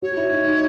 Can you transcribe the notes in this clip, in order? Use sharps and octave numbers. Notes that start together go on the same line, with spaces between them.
F#4 C#5
E4
D#4
D#4